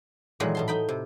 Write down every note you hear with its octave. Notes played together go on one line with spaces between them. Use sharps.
A#2 D#3 E3 F#3 G#3
A2 A5 C6
D#4 G5 B5
C3